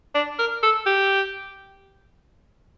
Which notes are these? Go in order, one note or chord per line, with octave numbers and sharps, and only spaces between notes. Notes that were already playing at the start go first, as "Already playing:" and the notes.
D4
A#4
A4
G4